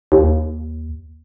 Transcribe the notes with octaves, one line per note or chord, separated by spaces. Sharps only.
D#2